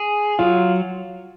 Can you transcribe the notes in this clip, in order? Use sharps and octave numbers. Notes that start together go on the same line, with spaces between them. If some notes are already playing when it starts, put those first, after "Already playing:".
Already playing: G#4
F#3 F4